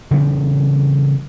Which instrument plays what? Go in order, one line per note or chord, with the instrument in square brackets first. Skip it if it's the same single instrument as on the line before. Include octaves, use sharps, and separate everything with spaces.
[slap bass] C#3 E3 G3 C4